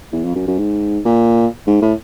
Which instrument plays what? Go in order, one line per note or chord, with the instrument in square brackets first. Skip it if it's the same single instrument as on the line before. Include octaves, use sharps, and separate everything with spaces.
[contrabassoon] E2
F2
F#2
F#2
G#2
A#2
G#2
A2